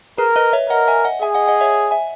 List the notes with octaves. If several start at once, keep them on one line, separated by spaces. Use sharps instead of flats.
G#4 A#4 B4
B4 D#5
C#5 E5
A#4 D#5 F#5
E5 G#5
D#5 F#5
G#4 E5 G#5
D#5 F#5
D#5 F#5
C#5 E5
E5 G#5